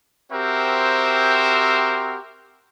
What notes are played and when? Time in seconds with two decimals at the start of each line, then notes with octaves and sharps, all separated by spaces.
0.32 C4 F#4 G4 A#4 C5 E5